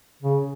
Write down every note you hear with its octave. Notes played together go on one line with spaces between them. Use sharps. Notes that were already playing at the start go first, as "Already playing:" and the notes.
C#3